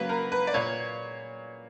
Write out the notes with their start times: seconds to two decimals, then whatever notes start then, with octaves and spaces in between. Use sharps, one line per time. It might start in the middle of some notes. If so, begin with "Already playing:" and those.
Already playing: C#3 F#3 A#3 B4
0.09 A#4
0.32 B4
0.47 D5
0.54 A#2 A#3 C#5